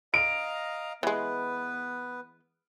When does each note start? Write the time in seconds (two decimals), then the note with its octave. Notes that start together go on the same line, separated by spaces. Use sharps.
0.14 D#5 F5 A#5 D7
1.03 E3 G#3 B3 B4